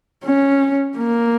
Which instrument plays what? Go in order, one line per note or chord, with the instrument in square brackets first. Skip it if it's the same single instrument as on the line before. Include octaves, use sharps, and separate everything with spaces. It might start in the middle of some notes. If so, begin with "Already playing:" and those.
[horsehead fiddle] C#4
A#3